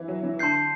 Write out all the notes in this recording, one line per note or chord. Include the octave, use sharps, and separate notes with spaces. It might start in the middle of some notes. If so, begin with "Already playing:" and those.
Already playing: E3
F#3
E3
D3 A5 C6 G6 C7